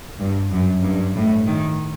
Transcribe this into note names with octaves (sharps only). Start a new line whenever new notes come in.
G2
F#2
G2
A2
D#3